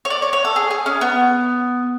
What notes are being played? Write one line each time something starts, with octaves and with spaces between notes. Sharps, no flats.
C#5
D5
C#5
C#5
A4
G#4
G#4
C#4
B3